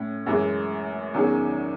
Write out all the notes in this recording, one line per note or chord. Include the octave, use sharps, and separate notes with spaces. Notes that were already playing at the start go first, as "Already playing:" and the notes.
Already playing: A2 C#4
F#2 E3 G#3
E2 D#3 F#3 C#4 G#4